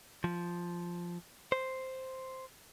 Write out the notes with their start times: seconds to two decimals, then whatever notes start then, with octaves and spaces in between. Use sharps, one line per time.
0.24 F3
1.52 C5